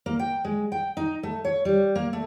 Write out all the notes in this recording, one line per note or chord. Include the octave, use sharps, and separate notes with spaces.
A#3
G5
G#3
G5
D#4
A3
C#5
G3
A#3
A3